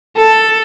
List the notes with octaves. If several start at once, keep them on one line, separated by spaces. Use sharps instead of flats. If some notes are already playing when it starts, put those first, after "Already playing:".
A4